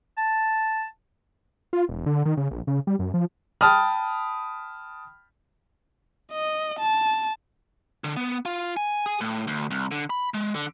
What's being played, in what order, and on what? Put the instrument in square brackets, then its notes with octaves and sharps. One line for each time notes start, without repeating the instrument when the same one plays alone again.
[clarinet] A5
[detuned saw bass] F4
E1
D3
D#3
C#3
A#1
C#3
G3
F#2
F3
[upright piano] G5 A5 B5 D#6 F6
[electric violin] D#5
A5
[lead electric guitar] D3
B3
F4
G#5
G#4
A2
D2
C2
D3
B5
G#3
D3